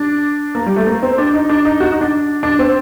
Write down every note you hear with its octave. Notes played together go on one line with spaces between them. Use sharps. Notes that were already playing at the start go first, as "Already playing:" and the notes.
Already playing: D4
A#3
G3
A3
A#3
C4
D4
D#4
D4
D#4
F#4
D#4
D4
D4
C4